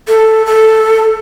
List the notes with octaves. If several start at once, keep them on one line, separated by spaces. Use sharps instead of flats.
A4
A4